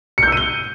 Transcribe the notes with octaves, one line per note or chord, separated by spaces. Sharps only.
E6 G6 C#7 D#7 G7